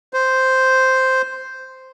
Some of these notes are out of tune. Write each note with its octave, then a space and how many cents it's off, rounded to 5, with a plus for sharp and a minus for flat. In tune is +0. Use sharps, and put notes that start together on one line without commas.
C5 -5